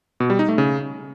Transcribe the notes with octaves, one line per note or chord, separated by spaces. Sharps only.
B2
G3
D#4
A3
C#3